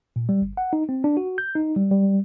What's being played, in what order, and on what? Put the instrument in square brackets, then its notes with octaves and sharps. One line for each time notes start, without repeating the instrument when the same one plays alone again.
[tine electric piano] A#2
G3
G1
F#5
D#4
C4
D4
F#4
G6
D#4
G3
G3